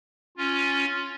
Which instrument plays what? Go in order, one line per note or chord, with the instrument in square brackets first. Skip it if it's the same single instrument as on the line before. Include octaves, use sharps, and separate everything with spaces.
[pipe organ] C#4 F4